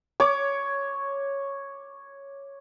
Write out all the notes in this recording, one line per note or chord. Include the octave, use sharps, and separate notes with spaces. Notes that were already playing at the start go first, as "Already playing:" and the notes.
C#5 D6